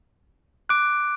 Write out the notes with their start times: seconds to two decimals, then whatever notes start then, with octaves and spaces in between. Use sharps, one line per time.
0.69 D6 F#6 D7